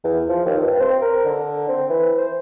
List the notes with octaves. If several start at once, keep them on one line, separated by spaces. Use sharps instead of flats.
E2
F3
D#2
G2
C4
A#4
D3
C4
E3
C5